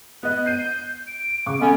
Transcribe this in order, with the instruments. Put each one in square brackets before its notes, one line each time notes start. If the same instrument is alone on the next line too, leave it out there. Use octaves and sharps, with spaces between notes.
[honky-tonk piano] B3 D#5 [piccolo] F#6
[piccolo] G6 [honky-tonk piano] C7 D#7
[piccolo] D7
[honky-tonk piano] C#3 C#6 D6
[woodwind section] G#3 B3 C#4 [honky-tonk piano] A4 [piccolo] B5